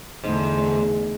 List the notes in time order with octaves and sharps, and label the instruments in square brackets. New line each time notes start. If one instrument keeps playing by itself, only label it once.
[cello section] E2 D3 A3 [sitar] G#2